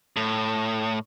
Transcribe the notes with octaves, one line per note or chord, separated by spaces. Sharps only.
A2